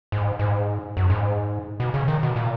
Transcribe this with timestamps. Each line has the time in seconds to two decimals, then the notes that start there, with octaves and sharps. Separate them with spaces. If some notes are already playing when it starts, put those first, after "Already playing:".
0.12 G#2
0.39 G#2
0.97 F#2
1.10 G#2
1.80 B2
1.94 C#3
2.08 D#3
2.23 B2
2.36 A#2